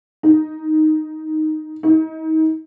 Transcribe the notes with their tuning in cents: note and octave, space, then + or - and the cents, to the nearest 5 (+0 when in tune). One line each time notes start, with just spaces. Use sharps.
D#4 +0
D#4 +30